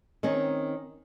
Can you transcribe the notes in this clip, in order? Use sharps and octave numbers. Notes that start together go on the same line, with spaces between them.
D#3 C4 C#4 D#4